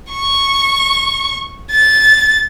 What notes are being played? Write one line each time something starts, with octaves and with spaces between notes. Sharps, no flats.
C#6
A6